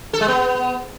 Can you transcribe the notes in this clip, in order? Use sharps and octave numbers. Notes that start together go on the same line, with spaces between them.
A4
G#3
B3